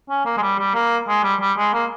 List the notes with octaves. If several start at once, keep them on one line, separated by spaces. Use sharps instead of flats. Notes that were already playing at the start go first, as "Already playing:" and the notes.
C#4
A#3
G#3
G3
G3
A#3
G#3
G3
G3
G#3
A#3